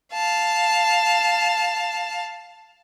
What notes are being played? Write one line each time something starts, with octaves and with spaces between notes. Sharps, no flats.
F5 A5